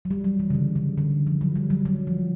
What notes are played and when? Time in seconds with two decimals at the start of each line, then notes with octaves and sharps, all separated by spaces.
0.05 F#3
0.11 G3
0.24 F#3
0.39 E3
0.50 C#3
0.54 D3
0.76 C#3
0.98 D3
1.27 F3
1.41 F#3
1.56 G3
1.70 F#3
1.85 F#3
2.07 F3